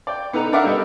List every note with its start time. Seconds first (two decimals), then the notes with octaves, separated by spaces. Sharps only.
0.07 D5 G5
0.33 B3 D#4 A4 B4 A#5
0.52 D4 A#4 D5 E5 F#5
0.64 G3 B3 A4 D#5